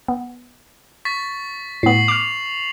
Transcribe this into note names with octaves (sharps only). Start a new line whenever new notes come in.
B3
C#6 A6 B6
A2 B3 C7 F#7
D6 F6 F7